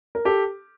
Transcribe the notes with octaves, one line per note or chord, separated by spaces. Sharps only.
A#4
G4 A4